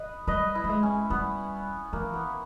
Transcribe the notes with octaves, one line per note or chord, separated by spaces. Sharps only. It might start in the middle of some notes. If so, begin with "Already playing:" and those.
Already playing: B4 D#5
G3 B4 D#5
E4
G3
G#3
C#4
G3 B3
E3 A#3
B3